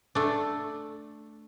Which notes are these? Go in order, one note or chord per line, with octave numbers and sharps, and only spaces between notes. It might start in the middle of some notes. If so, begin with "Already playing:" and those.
A3 D4